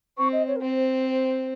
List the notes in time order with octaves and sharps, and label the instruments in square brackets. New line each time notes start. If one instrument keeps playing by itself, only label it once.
[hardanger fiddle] C4 [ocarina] C#6
[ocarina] D#5
C#5
A#4
[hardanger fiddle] C4 [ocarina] C5
[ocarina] C5
C5